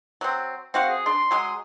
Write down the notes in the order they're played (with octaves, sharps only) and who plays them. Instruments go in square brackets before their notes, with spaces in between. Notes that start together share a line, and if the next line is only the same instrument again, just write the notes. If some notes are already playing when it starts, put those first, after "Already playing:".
[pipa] F#3 C4
[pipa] C4 F#4 F5 [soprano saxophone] F#5
[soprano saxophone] G#4
[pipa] D4 [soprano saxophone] C6
[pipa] F#3 G#3 G#4